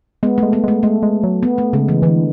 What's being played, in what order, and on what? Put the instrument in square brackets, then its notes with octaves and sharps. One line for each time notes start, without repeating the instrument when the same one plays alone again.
[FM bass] G#3 [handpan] B3
[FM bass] G#3 [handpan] A3
[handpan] B3
[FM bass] G#3 [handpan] A3
[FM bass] G#3 [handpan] A3
[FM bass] G#3
F#3
[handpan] B3
A3
[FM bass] C#3 [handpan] G#3
[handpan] E3
[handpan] D3 [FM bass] E3